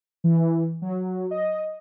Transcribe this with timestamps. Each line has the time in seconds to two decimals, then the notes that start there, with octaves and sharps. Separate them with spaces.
0.24 E3
0.82 F#3
1.31 D#5